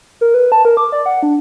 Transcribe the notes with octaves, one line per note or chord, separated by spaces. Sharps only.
A#4
B4
A5
A#4
D6
D5
F#5
D4